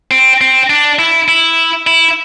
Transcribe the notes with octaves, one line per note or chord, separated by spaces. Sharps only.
C4
C4
D4
E4
E4
E4